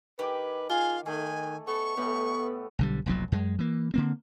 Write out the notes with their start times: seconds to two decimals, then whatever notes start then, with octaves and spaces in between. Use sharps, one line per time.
0.19 D#3 G4 B4 G#5 D6
0.69 F4 G#4 F5
1.06 D#3 A3 G#4 G#5
1.67 B3 A4 C#6
1.97 A2 E3 A3 B3 G4
2.79 B1 D3 G3
3.06 F1 B1 A#2 F#3
3.32 F#2 G#3
3.59 E3 A#3
3.94 D3 A#3 C4